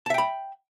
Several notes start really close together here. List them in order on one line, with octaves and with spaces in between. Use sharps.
A5 E5 G5 B5